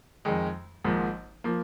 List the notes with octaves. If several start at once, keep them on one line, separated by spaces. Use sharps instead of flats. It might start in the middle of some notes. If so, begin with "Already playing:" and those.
F2 D#3 G#3
G#1 G#2 F3 A#3
F3 A#3